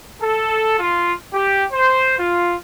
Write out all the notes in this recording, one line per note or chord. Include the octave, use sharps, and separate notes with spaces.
A4
F4
G4
C5
F4